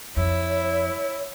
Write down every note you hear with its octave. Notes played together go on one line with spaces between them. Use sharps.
F2 E4 C#5